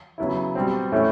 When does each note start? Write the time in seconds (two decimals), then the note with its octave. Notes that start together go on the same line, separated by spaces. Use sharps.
0.18 C#3 F#3 B3 E4
0.55 B2 G3 C4
0.92 A2 E3 A3 C#4